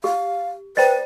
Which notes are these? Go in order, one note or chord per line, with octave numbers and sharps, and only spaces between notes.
G4 F5
B4 C5 D5 G5 A6